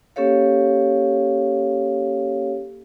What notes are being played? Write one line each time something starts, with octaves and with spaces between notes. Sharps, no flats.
A#3 C#4 G4 A4 C#5 F5